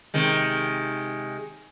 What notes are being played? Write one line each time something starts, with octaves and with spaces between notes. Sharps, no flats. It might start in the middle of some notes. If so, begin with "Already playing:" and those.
C3 D#3 G#3